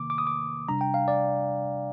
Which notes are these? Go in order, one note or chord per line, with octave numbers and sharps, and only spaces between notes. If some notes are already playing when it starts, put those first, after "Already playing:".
Already playing: C3 D#3 A#3 D6
D6
D#6
D6
C3 G3 D4 A#5
G5
F5
D5